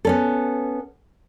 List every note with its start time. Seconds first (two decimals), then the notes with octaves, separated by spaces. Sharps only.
0.05 B3 C#4 A4